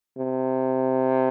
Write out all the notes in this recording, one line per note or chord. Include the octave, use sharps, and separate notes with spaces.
C3